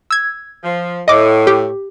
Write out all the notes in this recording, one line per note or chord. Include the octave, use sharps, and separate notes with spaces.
E6 G#6
F3
A2 D#5 D6
G4